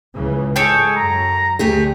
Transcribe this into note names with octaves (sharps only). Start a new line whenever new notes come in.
C#2 C#3 E3
G#2 G#3 G#4 A4 C#5 G5
F#2 A#5
D2 A3 G4 G#4